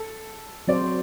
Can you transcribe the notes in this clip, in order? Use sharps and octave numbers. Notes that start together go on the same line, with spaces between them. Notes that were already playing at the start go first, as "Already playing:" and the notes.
Already playing: A4
F#3 C4 F#4 C5 D5